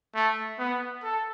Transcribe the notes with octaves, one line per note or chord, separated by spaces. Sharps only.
A3
B3
A4